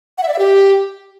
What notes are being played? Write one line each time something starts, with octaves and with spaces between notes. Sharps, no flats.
F#5
E5
D5
E5
G4